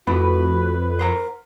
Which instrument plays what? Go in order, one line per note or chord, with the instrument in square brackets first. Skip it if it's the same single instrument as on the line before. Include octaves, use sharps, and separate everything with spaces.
[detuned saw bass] F2 [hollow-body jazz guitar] A3 E4 F#5 [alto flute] F#4 [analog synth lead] B4
[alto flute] A#4 [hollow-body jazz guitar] C5 F#5 A#5